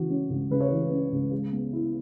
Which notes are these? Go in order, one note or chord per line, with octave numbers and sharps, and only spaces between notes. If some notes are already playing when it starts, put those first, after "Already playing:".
Already playing: C#3 E3 F#4
C#4
C#2
C#3 B4
C#5
E3 B4
C#4
C#2
G#3
B3
E4